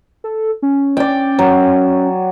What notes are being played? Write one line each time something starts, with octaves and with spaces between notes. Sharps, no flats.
A4
C#4
D5 G5
F#3